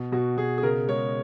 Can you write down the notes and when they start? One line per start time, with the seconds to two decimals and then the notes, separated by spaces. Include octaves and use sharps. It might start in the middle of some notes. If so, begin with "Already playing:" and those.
Already playing: B2
0.12 B2 F#4
0.37 B2 G#4
0.58 G#4
0.63 C#3 A#4
0.88 G#3 C#5